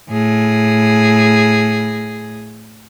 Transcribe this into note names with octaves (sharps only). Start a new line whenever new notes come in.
A2 G#4